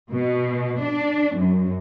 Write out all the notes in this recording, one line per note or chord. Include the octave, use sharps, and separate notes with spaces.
B2
D4
F#2